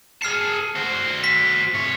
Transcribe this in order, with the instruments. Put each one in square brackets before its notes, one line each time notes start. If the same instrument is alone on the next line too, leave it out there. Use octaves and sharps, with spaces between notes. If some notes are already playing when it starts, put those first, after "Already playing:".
[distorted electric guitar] G#4 A5 [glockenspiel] F6 C7 C#7
[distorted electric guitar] F#4 C5
[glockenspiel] B6
[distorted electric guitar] C3 C#5